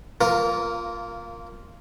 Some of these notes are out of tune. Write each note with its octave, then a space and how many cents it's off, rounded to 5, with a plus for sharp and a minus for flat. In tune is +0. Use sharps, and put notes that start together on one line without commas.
A#3 -20 F4 +0 A#4 +0